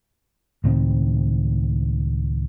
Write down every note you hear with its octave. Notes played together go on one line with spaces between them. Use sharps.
C#2 A2 D#3 C4